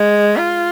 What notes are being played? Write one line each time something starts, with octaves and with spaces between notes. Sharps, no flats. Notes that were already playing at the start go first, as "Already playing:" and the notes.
Already playing: G#3
F4